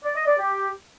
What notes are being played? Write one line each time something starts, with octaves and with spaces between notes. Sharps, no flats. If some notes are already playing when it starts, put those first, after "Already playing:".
D5
D#5
D5
G4